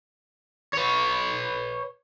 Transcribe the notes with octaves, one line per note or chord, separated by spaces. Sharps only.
B4 C#5